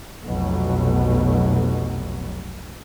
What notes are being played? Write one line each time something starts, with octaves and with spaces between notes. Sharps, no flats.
F1 B1 B2 F#3